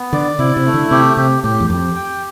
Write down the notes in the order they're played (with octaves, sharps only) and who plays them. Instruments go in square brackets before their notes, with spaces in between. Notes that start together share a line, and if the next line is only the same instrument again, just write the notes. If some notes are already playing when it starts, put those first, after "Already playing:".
Already playing: [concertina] B3
[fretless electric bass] D3 [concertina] D5
[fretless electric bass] C3 [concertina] E4
[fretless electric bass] C3
[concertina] A3
[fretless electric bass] D3
[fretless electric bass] C3 [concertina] G4
[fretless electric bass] C3 [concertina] G4
[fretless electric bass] A2 [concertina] G4
[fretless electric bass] E2
[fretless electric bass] F2 [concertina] G4
[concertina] G5